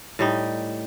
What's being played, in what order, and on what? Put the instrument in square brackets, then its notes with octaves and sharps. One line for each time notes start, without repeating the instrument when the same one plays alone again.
[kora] A2 G3 D#4